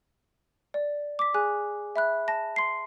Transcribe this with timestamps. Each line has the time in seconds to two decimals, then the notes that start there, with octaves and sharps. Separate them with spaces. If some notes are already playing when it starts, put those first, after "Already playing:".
0.74 D5
1.19 D6 B6
1.34 G#4 G#5 F#6
1.96 E5 B5 F#6
2.28 A5 A#6
2.56 C6 C7